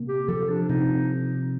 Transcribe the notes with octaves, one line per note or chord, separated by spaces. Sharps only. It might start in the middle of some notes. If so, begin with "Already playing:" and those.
Already playing: C3 A#3
G4
F3 A4
D4
C3 D#4